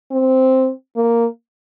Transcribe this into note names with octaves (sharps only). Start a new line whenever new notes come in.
C4
A#3